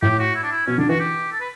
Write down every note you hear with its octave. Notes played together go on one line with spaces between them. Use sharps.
A2 G4
F#4
E4
D4
E4
B2 C#4
D3 D4
E3 F#4
G4
A4
B4